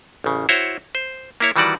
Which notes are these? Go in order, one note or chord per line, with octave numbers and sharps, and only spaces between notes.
A1 C#3
E4 F#4 C5 C#5
C5
A#3 E4 C#5
D#3 E3 G3 F#4 D5